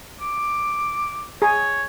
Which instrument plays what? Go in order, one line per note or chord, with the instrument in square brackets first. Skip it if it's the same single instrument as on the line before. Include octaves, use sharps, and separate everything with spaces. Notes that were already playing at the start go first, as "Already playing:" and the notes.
[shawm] D6
[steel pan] G#4 [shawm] C#5